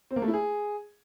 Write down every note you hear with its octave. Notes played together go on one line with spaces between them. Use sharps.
C4
A#3
A3
E4
G#4